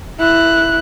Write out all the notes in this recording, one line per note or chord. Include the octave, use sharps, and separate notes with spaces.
E4 F#6